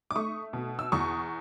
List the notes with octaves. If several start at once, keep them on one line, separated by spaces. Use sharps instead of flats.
D6
A3 C#6 D#6
B2
E6
E2 C#6 D#6